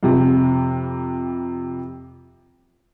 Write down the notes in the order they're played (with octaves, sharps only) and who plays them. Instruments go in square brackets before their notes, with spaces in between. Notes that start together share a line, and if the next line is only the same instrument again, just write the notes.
[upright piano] F2 C3